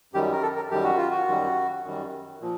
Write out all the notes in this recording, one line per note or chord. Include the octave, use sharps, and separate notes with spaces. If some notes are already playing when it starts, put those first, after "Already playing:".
F#2 D#3 G3 G4
A#4
A4
A#4
F#2 D#3 G3 G4
F#4
F4
F#4
F#2 D#3 G3
F#2 D#3 G3
A#2 F3